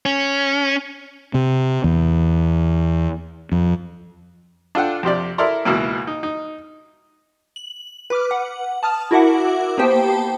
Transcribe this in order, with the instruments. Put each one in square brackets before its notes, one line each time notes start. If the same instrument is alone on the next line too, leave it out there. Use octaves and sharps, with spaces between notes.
[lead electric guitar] C#4
[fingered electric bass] C3
E2
F2
[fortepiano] D4 F4 A4 F#5 G5
F2 C3 G4 D5
E4 A4 A#4 D5 A#5 C6
C#2 B2 E3 A#3
D#4
D#4
[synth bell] F#7
B4 D6 F6
F#5
A5 D#6 F6
E4 F#4 A#4 E5 F#5 D6
A#3 B3 G4 C5 G5 A5